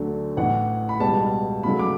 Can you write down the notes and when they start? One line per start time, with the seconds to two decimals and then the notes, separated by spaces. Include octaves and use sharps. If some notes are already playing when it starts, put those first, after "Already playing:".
Already playing: D2 D3 F#3 A3
0.37 A1 A2 E3 F#5
0.89 B5
1.00 C#2 B2 G3 A5
1.63 C#2 C#3 F#3 A3 B5
1.79 D6